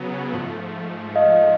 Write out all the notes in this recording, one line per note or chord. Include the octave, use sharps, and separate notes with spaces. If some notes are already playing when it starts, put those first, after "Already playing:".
Already playing: C#3 F#3 B3
G#2 F3 A3
D#5 F5